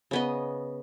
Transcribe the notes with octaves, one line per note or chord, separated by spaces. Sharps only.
C#3 B3 D#5